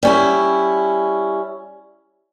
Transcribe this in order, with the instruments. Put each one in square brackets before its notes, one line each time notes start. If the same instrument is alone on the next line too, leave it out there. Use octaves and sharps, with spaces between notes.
[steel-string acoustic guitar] G3 C#4 E4